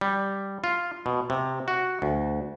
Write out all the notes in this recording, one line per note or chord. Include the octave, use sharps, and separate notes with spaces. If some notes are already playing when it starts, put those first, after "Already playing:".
G3
F4
B2
C3
F#4
D2